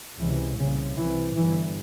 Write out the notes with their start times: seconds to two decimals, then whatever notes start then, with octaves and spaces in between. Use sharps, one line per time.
0.20 C#2 C3 E3
0.59 C2 A#2 C#3
0.97 C2 C3 E3
1.36 G1 G2 E3